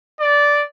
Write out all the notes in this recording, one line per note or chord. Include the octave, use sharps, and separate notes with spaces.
D5